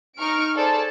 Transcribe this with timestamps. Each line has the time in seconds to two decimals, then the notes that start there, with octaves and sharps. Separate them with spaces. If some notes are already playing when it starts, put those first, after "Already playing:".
0.19 D#4 C#6 F6 D7
0.55 G#4 A4 C5 D5 A5